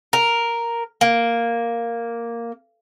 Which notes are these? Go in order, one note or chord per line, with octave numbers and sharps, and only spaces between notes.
A#4
A#3